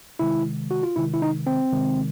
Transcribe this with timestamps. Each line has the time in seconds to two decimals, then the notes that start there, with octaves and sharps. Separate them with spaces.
0.19 C3 D#3 G#3 E4
0.71 F#4
0.83 F4
0.96 C3 D#3 G#3 E4
1.14 E4
1.22 D#4
1.47 C4
1.72 C3 D#3 G#3